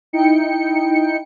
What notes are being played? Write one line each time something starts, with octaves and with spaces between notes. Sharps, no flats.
D#4 E4 G5 C#7